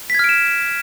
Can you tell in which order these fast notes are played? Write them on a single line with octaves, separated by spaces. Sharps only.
B6 G#6 F6 D7 E7